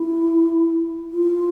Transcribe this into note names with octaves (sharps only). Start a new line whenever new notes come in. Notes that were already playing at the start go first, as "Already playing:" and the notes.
Already playing: E4
F4